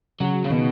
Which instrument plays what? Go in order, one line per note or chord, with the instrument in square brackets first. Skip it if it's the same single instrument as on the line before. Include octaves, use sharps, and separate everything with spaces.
[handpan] C#3 [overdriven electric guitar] F#3
[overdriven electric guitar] C#3
[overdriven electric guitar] B2 [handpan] D#3